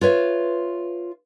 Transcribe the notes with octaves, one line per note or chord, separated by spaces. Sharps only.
F4 B4 C#5 E5